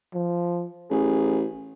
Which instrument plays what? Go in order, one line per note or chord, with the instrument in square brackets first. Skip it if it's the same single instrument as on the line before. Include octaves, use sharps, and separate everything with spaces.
[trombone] F3
[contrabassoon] A1 [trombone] G#4